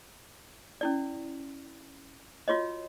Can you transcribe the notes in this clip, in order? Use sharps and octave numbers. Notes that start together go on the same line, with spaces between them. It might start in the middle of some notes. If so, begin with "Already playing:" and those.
C#4 E4 D5
F4 F#4 C#5 D#5